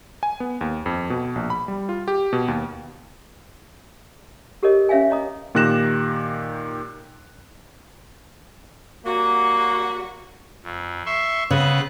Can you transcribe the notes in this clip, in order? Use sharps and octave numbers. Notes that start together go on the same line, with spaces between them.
G#5
B3
D#2
F2
B2
A#1
B5
G3
F4
G4
B2
D#2
G4 A4 A#4 C#5 D#5
C#4 C#5 E5 F5 G#5
C#5 D#5 A#5 D#6
A#2 D#3 G4 F#6 A#6 E7
F#3 G3 A#3 F#4
F2
E5 C6 C#6
C#3 B3 C4 F#6